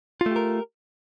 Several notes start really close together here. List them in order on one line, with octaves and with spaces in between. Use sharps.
F4 A3 G4 A#4